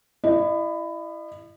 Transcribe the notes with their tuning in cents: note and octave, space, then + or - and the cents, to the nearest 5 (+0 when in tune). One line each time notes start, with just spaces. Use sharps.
E4 +15 D#5 -40